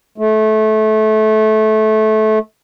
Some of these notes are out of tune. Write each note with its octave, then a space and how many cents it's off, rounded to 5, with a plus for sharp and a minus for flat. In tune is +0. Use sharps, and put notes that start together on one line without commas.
A3 -20